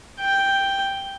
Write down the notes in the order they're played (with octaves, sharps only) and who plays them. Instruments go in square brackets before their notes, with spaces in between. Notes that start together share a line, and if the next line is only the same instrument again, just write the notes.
[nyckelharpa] G5